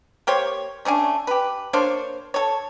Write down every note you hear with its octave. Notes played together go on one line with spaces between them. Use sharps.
A#3 G4 C5 C#5
A3 C#4 D4 G#5
G4 B4
A#3 D4 C5 C#5
A4 C#5